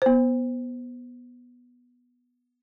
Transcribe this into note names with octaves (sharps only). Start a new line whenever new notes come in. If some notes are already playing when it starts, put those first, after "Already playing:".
B3 C5